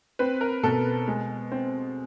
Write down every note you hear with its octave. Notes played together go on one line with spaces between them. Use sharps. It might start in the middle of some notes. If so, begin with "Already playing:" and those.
C4 B4
A#4
B2 A4
G#3
C4